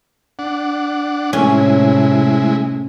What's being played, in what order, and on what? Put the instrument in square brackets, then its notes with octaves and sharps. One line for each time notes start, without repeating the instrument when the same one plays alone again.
[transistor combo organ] D4 F#5
[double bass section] A2 C3 A3 [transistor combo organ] G#3 E4 [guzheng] C#4